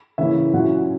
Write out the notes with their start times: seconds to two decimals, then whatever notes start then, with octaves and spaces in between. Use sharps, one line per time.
0.18 C#3 E3 A#3 C#4 E4 E5
0.53 A#2 F#3 C#4 E4 F#5